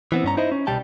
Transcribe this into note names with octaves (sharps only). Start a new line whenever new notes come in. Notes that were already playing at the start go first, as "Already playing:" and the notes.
E3 B3 C4
G2 C#4 A#5
D#4 E4 C5 D#5
C#4
C2 B2 G3 G5 A5